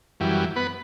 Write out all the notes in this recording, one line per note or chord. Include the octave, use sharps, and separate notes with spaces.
F#2 E3 G3
B3 B4